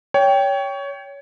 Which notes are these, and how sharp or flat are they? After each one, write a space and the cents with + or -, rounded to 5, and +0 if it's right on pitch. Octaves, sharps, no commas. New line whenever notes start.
C#5 +20 G5 +0